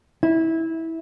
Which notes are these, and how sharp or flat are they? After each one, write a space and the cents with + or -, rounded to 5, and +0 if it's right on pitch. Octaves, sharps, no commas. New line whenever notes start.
E4 -20